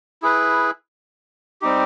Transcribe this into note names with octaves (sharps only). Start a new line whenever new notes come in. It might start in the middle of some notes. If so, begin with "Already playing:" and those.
E4 G#4 B4
G3 C4 D#4 G4